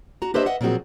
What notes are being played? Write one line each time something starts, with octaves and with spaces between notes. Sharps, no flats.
F#4 A#5
D4 G4 B4 C5 D#5 E5
D#5 E5 F#5
A#2 F3 F#3 C4 F#4 G#4